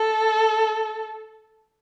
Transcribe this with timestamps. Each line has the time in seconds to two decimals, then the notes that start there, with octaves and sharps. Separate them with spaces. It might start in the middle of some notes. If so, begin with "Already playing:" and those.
Already playing: A4